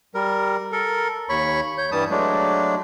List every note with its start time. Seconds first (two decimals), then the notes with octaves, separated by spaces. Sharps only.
0.15 G3 A#4
0.72 A4 A#4
1.29 D#2 C#5 B5 C#6
1.78 C#5 G6
1.92 G2 E3 G3 A5 D#6
2.11 F#3 G#3 A3 D4